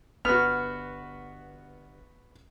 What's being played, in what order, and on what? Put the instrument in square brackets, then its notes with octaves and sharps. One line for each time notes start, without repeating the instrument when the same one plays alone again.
[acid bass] G1 [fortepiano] B3 F#4 [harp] F6